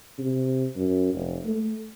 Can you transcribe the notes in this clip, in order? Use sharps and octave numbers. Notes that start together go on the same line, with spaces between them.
C3
F#2
F1
A3